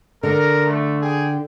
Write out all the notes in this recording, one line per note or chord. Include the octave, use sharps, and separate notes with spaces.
D3 A#4
A3
G#4 G5